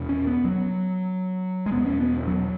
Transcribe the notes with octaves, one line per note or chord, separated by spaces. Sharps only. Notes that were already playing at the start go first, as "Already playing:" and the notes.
Already playing: E2 B2
C#4
B3
F#3
G#3
E2 B2 B3
C#4
B3
F#3